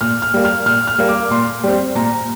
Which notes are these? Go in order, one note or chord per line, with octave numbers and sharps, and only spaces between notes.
A#2 F6
F6
G3 A#3
F6
A#2 F6
F6
G3 A#3
D6
A#2 C6
G3 C4
A#2 A#5